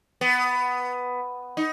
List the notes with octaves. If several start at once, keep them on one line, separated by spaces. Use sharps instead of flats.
B3
D#4